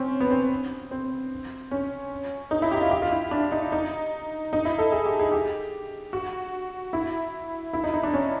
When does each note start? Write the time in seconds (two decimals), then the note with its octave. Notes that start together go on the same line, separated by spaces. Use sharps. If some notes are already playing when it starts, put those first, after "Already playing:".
Already playing: C4 C#4
0.20 B3
0.31 C4
0.91 C4
1.71 C#4
2.51 D#4
2.62 E4
2.71 G4
2.81 F4
2.91 G4
3.02 F4
3.11 E4
3.31 D4
3.52 D#4
3.72 D#4
4.53 D#4
4.65 E4
4.78 A4
4.92 G#4
5.05 G4
5.19 G#4
5.32 G4
6.13 F#4
6.93 E4
7.73 E4
7.84 D#4
7.94 D#4
8.03 D4
8.13 C#4